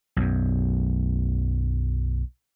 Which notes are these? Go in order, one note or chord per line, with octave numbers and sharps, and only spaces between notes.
B1 F#2